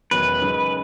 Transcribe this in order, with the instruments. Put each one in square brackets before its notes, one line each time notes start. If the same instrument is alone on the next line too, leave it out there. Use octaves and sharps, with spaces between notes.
[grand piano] E1 E2 D#3 F#3 C#4 [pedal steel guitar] B4
[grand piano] F#1 F#2 C#3 G#3 D#4